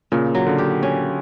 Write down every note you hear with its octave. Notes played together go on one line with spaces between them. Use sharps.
A#2 C#3
F#3
D3
G4
C#4